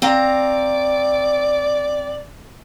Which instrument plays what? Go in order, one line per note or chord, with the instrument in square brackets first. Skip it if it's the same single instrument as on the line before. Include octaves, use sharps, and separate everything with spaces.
[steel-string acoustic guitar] C4 F5 A#5 [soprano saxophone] D5